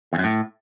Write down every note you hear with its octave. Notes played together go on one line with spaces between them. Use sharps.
E2
F#2
A2